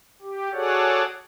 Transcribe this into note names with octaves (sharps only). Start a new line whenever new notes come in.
G4
F#4 G#4 A4 C#5 D5 F#5